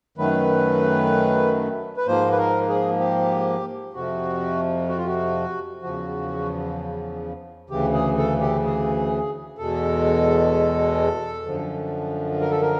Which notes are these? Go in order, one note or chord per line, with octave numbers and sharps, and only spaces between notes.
F#2 D#3 F#3 A3 B4
B4
G#2 F3 A#3 C5
B4
A#4
G#4
G4
F2 C3 F3 F#4
F#4
F4
F#4
E2 C#3 F3 F#4
D2 C#3 E3 G4
G#4
A4
G4
G#4
E2 B2 G#3 A4
F#2 D3 F3
A#4
A4
A#4